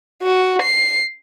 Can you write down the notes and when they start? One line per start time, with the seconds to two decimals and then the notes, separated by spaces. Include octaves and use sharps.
0.22 F#4
0.62 C7